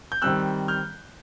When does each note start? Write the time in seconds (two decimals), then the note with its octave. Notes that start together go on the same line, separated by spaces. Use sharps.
0.12 G6
0.22 D#3 G3 C4 E6 F#6
0.68 F6 G6